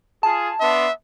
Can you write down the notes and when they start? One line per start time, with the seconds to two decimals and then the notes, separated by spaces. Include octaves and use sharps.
0.23 F4 G#4 A5
0.60 B3 D4 E5 C6